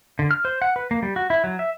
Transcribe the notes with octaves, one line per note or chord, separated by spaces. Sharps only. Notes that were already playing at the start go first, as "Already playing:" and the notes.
D3
F6
C5
F#5
B4
A#3
G3
F#4
E4
F#3
E5